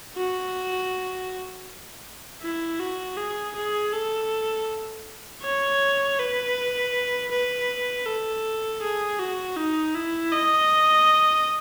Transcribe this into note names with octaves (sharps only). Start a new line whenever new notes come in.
F#4
E4
F#4
G#4
G#4
A4
C#5
B4
B4
A4
G#4
F#4
D#4
E4
D#5